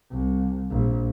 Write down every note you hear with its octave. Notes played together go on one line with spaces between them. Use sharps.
C2
A#1